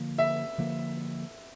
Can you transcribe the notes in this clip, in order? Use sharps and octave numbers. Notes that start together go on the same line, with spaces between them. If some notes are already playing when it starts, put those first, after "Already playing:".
Already playing: D3 F3 A#3
E5
D3 F3 A#3